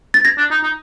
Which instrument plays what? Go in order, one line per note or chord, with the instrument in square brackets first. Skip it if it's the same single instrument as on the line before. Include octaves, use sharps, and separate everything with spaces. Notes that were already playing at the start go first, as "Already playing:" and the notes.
[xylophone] A6
G#6 A#6
[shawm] D4
D#4
D#4